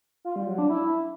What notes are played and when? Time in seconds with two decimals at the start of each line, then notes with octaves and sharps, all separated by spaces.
0.25 F4
0.36 G3
0.47 F#3
0.58 D4
0.70 E4